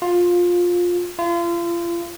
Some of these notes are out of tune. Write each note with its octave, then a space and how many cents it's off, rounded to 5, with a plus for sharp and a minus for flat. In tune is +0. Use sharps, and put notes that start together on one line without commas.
F4 +15
F4 -35